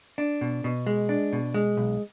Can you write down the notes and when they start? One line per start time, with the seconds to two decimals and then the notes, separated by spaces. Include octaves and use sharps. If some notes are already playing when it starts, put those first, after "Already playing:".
0.18 D4
0.41 B2
0.64 B2
0.87 G#3
1.09 D4
1.33 B2
1.54 G#3
1.77 B1